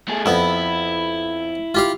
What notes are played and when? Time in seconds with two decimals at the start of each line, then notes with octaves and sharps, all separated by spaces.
0.08 A3 G#4
0.26 F2 B3 E4
1.75 F4 G4 F5